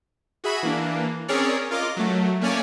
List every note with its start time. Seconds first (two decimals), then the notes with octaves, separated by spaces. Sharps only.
0.44 F#4 G#4 E5 B5
0.63 E3 A#3 D4
1.28 C4 C#4 G#4 A#4 C#5 D5
1.71 F4 A#4 D#5 D6
1.96 F#3 A3
2.41 A3 A#3 C#4 C#5 D5 G#5